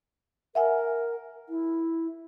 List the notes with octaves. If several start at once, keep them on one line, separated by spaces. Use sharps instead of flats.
A#4 E5 F#5 G#5
E4